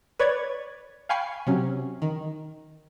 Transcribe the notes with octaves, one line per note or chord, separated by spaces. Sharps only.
B4 C#5 D5 G#6
F5 G5 G#5 B5 C#6 C7
C3 F#3 C#4
D#3